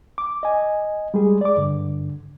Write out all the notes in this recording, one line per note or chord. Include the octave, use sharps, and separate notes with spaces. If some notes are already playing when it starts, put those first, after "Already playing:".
D6
D#5 G#5
G3 G#3 G#4
D5 D6
G2 D3